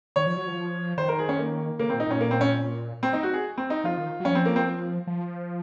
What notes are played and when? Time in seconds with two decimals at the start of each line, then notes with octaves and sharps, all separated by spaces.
0.16 D#3 C#5
0.27 F3
0.37 F#3
0.47 F3
0.97 D#3 C5
1.09 A#4
1.19 G#4
1.29 C#4
1.39 A#3
1.79 C#3 A#3
1.90 A#2 C4
2.00 D#4
2.07 A#2 C#4
2.21 A#3
2.31 C4
2.41 C#4
3.03 C4
3.13 D#4
3.23 F#4
3.34 G#4
3.58 C4
3.70 D#4
3.84 F3 F4
3.98 D#3
4.20 F#3
4.25 F3 C#4
4.35 C4
4.46 A#3
4.56 C4
5.07 F3